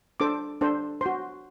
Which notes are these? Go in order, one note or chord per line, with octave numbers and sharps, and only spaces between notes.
D4 A4 C5 D6
D4 A4 C5
F#4 C5 C6